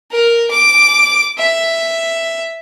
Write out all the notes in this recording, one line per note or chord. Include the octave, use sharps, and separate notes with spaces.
A#4
D6
E5